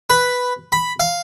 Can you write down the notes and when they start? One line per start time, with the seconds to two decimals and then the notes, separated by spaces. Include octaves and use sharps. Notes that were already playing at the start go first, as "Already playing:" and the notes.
0.10 B4
0.72 B5
1.00 F5